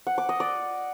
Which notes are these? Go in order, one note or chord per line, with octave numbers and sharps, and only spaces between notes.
F#5
D6
D#5
D5